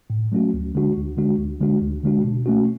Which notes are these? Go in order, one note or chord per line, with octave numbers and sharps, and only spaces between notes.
A2
F#3 A3 C#4 F#4
D2
D3 G#3 D4 F#4
D2
D3 G#3 D4 F#4
D2
D3 G#3 D4 F#4
D2
D3 G#3 D4 F#4
B2
A3 C#4 F#4